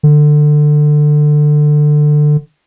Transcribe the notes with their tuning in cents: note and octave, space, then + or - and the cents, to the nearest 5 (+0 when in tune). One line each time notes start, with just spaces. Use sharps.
D3 +20